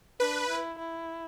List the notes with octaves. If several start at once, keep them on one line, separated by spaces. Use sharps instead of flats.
D4 B4
E4
E4